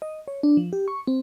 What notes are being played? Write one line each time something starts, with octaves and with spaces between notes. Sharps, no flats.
D#5
C#5
D4
F3
G4
C#6
C4